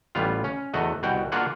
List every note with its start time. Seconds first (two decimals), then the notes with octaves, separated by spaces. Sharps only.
0.15 A1 G3 B3 F4 F5
0.44 C#4
0.74 E2 A3 F#4 D#5
1.03 C2 B2 F#4 G5
1.32 A#3 D4 F4 F#4 G#4 F#5